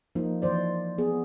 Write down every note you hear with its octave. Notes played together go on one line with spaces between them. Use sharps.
F3 A#3 D#4
E3 F3 C5 D5
B3 G#4